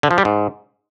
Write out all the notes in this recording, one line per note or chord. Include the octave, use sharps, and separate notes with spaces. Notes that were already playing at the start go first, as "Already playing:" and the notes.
D3
F3
G3
G#2